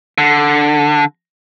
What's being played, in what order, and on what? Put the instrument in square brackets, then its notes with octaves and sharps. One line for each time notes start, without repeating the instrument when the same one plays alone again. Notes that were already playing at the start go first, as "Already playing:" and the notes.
[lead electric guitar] D3